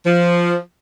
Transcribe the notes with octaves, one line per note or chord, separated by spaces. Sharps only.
F3